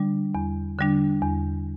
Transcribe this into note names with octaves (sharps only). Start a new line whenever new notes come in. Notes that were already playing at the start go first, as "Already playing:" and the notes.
Already playing: D3 G3 D4
E2
D3 G3 D4
E2